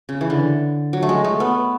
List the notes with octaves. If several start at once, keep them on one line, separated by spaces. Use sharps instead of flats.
C#3
E3
D3
F#3
A3
G#3
A3
B3